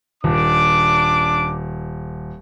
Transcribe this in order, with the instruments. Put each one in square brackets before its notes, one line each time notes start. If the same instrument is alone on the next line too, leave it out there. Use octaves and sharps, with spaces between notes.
[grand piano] D#1 [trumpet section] D4 D6